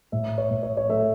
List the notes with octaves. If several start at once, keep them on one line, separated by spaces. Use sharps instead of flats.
A2 E5
C#5
A2
C#5
C#5
A3 E5